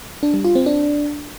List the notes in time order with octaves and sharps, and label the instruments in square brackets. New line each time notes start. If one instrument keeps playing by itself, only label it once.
[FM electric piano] D4
G3
F4
C4
D4